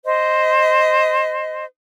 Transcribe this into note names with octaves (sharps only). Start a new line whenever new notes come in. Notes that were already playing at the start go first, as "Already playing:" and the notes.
C5 D#5